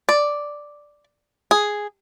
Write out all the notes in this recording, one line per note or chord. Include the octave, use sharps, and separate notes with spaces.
D5
G#4